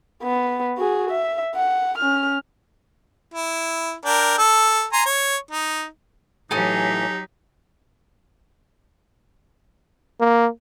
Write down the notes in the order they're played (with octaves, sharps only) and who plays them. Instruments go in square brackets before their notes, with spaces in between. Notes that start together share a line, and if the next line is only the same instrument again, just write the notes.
[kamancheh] B3
F#4 G#4
E5
F#5
C#4 F6
[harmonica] E4
D4 A#4 G5
A4
G#5 A#5 C6
C#5
D#4
[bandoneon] A2 E3 [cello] F#3 G4 [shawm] D#4 [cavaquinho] A4 G#5 D#6
[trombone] A#3